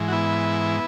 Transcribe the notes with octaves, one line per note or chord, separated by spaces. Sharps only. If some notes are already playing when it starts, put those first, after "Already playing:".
Already playing: G#2 E3
F#4
B3 E4